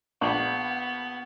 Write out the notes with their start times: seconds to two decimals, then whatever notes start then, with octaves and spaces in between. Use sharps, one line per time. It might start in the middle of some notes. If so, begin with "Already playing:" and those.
0.21 A#1 B3 D4 C#6